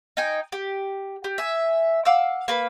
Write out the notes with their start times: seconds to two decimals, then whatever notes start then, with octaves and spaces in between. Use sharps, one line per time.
0.17 D#4 D#5 G5 G#5
0.52 G4
1.24 G4
1.38 E5 G#5
2.05 F5 F#5 D6 E6
2.48 A#3 B4 B5